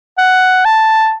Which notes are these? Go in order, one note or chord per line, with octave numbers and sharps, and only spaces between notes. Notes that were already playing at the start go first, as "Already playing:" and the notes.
F#5
A5